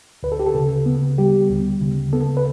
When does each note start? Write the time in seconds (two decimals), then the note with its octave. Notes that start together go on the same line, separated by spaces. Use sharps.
0.23 D2 B4
0.32 A4
0.40 G4
0.46 A4
0.55 C#3
0.86 B3
1.18 G3 G4
1.50 D2
1.81 C#3
2.13 B3 A4
2.37 B4